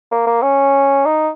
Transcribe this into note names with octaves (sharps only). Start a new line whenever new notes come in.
A#3
A#3
C#4
D#4